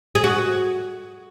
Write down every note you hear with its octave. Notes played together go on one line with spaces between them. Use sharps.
G#4
F#4